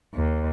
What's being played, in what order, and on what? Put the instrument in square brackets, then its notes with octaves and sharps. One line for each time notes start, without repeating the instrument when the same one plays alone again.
[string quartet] D#2